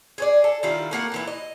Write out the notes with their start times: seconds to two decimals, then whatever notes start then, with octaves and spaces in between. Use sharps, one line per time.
0.18 G#4 C5 D5
0.44 A4
0.63 D#3 G3 E4 F4
0.91 A3 A#3 F#5
1.12 A#2 E3 E4
1.27 D#5